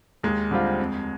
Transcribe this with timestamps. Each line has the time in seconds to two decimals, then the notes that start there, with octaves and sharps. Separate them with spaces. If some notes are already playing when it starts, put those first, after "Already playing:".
0.23 D#2 G#3
0.51 D3 G3 C4 F4
0.80 F2